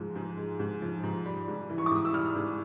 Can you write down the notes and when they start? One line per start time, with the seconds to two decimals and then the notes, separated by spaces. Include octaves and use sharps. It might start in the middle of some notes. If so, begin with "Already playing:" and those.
Already playing: G#2 F3 G#3
0.15 G#2
0.37 G#3
0.59 G#2
0.82 F3
1.03 G#2
1.26 G3
1.48 G#2
1.70 E3
1.78 C#6
1.86 D6
1.91 G#2 D#6
2.05 E6
2.13 G3 F6
2.35 G#2